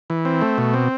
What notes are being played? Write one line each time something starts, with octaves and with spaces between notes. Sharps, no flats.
E3
C4
A3
B2
C4